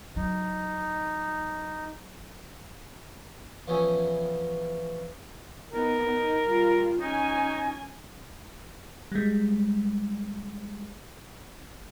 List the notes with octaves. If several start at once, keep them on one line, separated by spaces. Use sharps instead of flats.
F#3 D#4
E3 F3 B3 C#4 E4 G#4
B3 D#4 A#4
D#4
G3 F4
C#4 D#4 G#5
G3 G#3